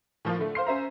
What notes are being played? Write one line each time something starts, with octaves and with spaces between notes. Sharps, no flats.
A2 F3 A#3 F4
D3 A3
C5 F5 C6 C7
C#4 C5 E5 A#5